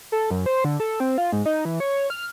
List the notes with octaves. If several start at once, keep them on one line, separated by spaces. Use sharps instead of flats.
A4
F#2
C5
D3
A4
C4
F4
G#2
D#4
E3
C#5
F6